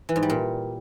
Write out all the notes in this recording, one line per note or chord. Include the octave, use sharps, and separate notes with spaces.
E3
G#2
G3
A#2